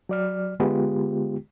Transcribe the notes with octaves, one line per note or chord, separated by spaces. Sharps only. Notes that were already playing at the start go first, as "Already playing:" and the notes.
F#3 D5 F6
D3 G#3 B3 F4 G4